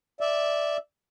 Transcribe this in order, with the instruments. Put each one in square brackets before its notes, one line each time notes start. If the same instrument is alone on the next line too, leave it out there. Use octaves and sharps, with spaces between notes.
[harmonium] D5 E5